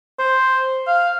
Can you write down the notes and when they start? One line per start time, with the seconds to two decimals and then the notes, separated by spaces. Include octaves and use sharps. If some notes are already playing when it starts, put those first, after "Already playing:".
0.19 C5
0.87 F5